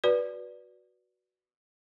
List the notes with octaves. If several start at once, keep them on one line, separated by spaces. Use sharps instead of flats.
F#4 B4 D5